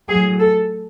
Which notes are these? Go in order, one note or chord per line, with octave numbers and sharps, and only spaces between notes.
A2 F#3 G#4
A4